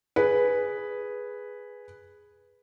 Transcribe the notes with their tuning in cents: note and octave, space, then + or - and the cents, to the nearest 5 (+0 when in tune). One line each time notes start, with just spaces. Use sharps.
G#4 +0 B4 +0